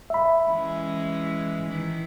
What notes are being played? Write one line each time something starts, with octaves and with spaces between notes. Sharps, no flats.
E5 B5
E3 G#3 C#4
D#3 E3